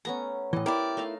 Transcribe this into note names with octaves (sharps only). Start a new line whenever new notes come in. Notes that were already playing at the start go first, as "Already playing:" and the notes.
A3 B3 C#4 A#5
A2 E3 D#5
E4 G4 A#4 D5
A3 D#4 F5